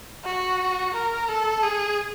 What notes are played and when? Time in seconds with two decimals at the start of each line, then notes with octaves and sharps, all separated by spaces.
0.25 F#4
0.94 A#4
1.29 A4
1.63 G#4